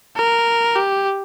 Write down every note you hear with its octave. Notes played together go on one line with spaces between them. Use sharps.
A#4
G4